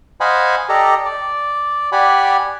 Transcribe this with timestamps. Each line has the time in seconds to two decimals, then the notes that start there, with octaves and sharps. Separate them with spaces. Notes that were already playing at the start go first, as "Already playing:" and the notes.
0.20 C5 D#5 F5 F#5 G#5 B5
0.69 G4 A4 D5 D#5 A#5
1.05 D5
1.92 G4 D5 F#5 G#5 B5